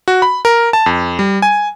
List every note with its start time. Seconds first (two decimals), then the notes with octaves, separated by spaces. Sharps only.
0.08 F#4
0.22 B5
0.45 A#4
0.73 A5
0.86 F2
1.19 G3
1.42 G#5